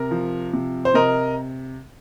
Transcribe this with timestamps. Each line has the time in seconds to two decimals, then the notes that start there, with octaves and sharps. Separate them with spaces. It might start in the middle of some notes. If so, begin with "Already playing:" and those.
Already playing: C3 A#4
0.11 F3
0.53 C3
0.85 C5
0.94 C3 A#4 D#5